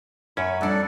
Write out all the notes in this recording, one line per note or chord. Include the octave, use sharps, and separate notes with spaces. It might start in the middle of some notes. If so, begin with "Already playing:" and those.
F#2 C#4 C#5 B5
F2 G3 D4 A4 D5 F#5